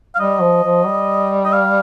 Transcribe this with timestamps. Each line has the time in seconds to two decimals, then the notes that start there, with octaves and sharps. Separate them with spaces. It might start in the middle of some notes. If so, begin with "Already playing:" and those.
0.15 F5
0.19 G3 D#5
0.41 F3
0.64 F3
0.86 G3
1.45 D#5
1.53 F5